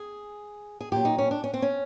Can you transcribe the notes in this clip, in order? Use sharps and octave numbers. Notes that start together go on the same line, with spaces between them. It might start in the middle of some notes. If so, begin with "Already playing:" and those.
Already playing: G#4
G#4
A#2 F#3 G4
D#4
C#4
D4
C#4
C4
C#4